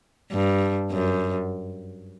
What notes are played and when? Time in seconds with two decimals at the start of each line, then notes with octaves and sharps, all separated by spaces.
0.32 G2
0.92 F#2